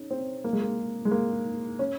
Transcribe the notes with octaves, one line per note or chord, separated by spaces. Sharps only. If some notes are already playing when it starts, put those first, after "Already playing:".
Already playing: C#4 D#4
C4
A#3
G#3
A#3
G#3
A#3
C#4